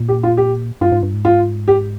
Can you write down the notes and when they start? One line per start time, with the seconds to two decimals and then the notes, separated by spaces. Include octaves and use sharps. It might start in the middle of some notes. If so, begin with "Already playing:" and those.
Already playing: A#2
0.08 G4
0.23 F4
0.37 G4
0.81 G2 F4
0.92 G#2
1.03 G2
1.14 G#2
1.25 F4
1.68 G4